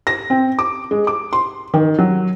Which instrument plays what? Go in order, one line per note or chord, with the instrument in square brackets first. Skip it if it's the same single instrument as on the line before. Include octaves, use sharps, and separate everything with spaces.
[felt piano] A#6
C4
D6
G#3
D6
C6
D#3
F#3